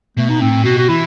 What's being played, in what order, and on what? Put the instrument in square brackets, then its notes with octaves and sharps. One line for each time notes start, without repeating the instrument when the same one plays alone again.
[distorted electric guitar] B2 [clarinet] A3
[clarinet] D#4
[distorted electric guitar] A2 [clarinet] C4
[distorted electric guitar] B2 [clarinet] F#4
[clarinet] F#4
[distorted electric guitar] E3 [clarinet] E4